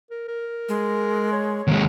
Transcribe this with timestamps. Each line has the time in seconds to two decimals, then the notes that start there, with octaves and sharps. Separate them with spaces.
0.10 A#4
0.28 A#4
0.69 G#3
1.32 C#5
1.67 D#2 G#3